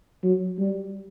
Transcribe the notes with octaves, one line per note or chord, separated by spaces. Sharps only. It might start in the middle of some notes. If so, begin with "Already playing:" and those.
F#3
G3